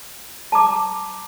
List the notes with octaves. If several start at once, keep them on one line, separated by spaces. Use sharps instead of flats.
A5 A#5 D6